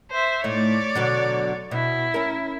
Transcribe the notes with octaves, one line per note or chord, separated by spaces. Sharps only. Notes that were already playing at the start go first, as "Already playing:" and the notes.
C5 E5
A2 A3 D#4 C#5 D5
B2 D3 F#3
B2 E4
C#4 A#4